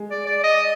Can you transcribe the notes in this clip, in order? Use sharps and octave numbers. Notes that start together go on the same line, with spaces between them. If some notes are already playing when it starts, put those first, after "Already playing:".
Already playing: G#3
D5
D5
D#5